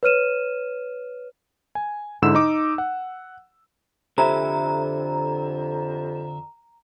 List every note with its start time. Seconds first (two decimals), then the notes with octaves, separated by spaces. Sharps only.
0.03 B4 C#5 F6 D#7 E7
1.75 G#5
2.22 G#2 D3 E4 E6 E7
2.35 D#4 D6
2.78 F#5
4.18 F2 D3 G4 C5 E5 A#5 B5